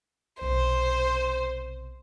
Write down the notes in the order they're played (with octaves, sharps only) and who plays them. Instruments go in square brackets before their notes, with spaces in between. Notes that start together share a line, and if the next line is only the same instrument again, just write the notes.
[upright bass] B1 C3 [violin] C5